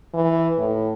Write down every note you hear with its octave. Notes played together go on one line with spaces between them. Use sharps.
E3
A2